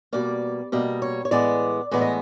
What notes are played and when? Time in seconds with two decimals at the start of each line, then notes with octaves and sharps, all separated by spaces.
0.13 B2 G3 A#3 D5
0.72 B2 G3 A#3 D#5
1.02 C#5
1.25 C#5
1.31 A2 E3 G#3 B3 D5
1.91 A2 E3 G#3 B3 D5
2.02 D#5